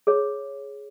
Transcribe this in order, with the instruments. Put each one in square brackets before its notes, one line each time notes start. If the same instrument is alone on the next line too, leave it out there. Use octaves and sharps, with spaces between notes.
[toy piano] G#4 C#5